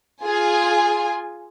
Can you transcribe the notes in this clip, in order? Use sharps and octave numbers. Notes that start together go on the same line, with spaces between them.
F4 G#4 G#5